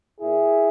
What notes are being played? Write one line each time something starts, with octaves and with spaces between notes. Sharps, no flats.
A#2 E4 G#4